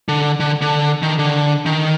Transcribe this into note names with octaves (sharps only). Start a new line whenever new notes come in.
D3
D3
D3
D#3
D3
D#3